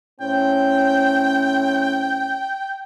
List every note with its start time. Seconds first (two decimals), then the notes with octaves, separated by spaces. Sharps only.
0.20 A2 C4 C#4 G5